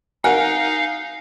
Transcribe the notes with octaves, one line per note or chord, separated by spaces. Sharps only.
D#4 A#4 F5 F#5 G#5